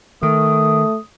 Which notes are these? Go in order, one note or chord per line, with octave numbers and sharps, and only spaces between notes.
D#3 A3 D#6